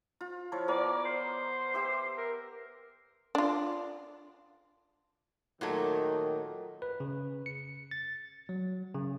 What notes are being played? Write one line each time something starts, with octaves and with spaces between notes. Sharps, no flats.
F4
F3 E4 C#5
B3 A#4 D5 D#5
C5
G4 E5 D6
A#4
D4 F4
A#2 D#3 F#3 A3
B4
C#3
C#7
A6
F#3
C#3